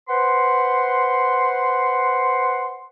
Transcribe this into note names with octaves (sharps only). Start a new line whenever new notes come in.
B4 C5 F#5 C6